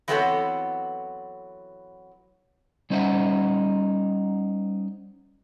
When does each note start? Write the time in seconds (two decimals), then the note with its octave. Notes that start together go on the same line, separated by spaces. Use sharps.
0.08 E3 F#3 B3 C4 A4 C#5
2.90 G3 C#4 D#4 C5 E5 F#5